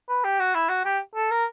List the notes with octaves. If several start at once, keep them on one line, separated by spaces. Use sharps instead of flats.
B4
G4
F#4
E4
F#4
G4
A4
A#4